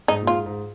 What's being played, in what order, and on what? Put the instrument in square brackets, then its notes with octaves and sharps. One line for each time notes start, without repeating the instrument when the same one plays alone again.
[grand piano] G#2 [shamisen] D#4
[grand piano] A#2
[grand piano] G#2 [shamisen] F4
[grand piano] G#2